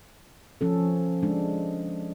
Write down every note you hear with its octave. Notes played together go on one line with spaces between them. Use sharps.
F3 C#4 A4
G#3 D4